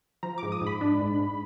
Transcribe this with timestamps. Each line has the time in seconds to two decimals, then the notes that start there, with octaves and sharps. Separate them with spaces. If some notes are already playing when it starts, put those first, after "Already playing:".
0.23 F3 A#5
0.38 G#2 D6
0.52 D#6
0.61 G#2
0.67 B5
0.81 D4
1.00 G#2
1.19 G#2